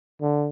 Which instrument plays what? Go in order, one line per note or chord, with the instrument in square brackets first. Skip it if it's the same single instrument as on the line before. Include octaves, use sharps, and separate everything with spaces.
[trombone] D3